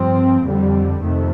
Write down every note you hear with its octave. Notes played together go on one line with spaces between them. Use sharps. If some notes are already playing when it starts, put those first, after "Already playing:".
Already playing: G2 F3 C4
F2 D3 G3
F2 C3 D#3 A3